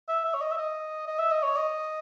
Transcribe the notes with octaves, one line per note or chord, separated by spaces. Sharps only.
E5
E5
C#5
D#5
E5
D#5
D#5
E5
D#5
C#5
D#5